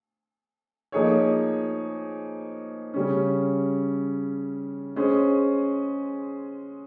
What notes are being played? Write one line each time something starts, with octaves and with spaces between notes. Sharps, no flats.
F3 A#3 D#4 G#4 C#5
C#3 G3 C#4
G#3 C#4 G#4 C5